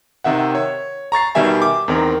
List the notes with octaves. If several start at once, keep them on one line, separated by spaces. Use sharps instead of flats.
C3 D#3 E5 F#5
C#5
A#5 C#6 A6 C7
B2 D#3 G3 G4 E5 G#5
D6
E2 D#3 C4 A#4